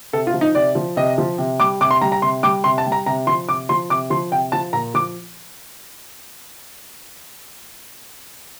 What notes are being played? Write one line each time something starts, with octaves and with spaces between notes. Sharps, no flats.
C3 A4
F4
F3
D#4
C3 D5
F3
C3 D#5
F3
C3
G3 D6
C3 D6
C6
G3 A#5
A#5
C3 C6
G3 D6
C3 C6
A5
G3
A#5
C3 A#5
F3 C6
C3 D6
F3 C6
C3 D6
F3 C6
C3 G5
F3 A5
A#2 A#5
F3 D6